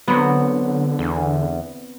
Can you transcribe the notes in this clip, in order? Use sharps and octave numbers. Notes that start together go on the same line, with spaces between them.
D3 F#3 B3 C4
E2